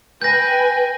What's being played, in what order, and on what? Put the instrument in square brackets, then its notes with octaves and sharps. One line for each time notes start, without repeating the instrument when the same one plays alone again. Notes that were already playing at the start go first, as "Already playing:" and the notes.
[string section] B4 G5 G#5 [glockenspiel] G6 A#6